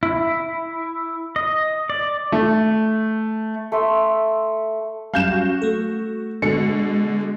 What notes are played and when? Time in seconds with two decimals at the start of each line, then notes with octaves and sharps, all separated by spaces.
0.03 E4
1.36 D#5
1.90 D5
2.32 A3
3.72 A3 E5 C6
5.14 F#3 G3 C#4 F5 G6 E7
5.32 F#4
5.62 A3 A4
6.42 B2 D3 G#3 C#7